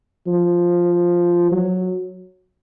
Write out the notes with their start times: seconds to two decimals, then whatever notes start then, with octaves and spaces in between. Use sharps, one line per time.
0.26 F3
1.51 F#3